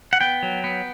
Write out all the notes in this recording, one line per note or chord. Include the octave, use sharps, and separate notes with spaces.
F#5
B3 G5
F#3
B3